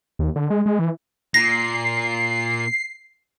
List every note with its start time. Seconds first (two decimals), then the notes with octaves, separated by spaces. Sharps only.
0.19 D#2
0.36 D3
0.50 G#3
0.66 G#3
0.79 E3
1.34 A#2 A#6 C7